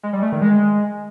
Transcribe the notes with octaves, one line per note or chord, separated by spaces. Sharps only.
G#3
G3
A3
D#3
G#3